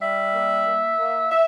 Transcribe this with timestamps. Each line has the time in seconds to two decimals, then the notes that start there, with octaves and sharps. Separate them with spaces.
0.01 G3 E5
0.34 A#3
0.67 A#3
0.99 A#3
1.31 E5